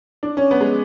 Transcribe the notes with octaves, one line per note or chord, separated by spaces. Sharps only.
D4
C#4
B3
G#3